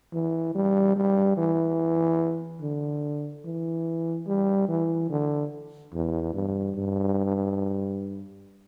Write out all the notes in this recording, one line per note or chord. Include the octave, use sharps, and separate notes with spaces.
E3
G3
G3
E3
D3
E3
G3
E3
D3
E2
G2
G2